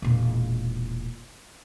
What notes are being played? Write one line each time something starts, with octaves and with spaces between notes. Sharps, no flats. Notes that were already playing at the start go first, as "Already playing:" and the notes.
E1 A#2